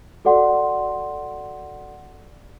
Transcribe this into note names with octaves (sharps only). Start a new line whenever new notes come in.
F#4 A4 D5 F#5 C6